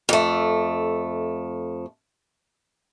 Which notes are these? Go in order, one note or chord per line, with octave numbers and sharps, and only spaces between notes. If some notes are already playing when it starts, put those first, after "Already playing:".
F2 A3